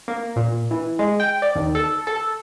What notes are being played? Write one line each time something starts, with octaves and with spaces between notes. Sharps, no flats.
A#3
A#2
E3
G#3
G5
D5
D#2
A4
A4